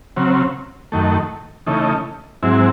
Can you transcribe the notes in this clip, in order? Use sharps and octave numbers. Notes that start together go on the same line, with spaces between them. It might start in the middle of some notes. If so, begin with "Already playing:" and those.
C#3 F#3 C4
F#2 D#3 A3
C#3 E3 A3 D#4
G#2 F#3 C4 E4